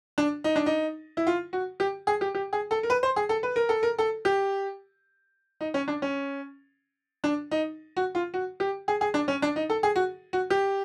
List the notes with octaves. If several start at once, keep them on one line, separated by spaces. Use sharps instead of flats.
D4
D#4
D4
D#4
E4
F4
F#4
G4
G#4
G4
G4
G#4
A4
A#4
B4
C5
G#4
A4
B4
A#4
A4
A#4
A4
G4
D#4
C#4
D4
C#4
D4
D#4
F#4
F4
F#4
G4
G#4
G#4
D4
C#4
D4
D#4
A4
G#4
F#4
F#4
G4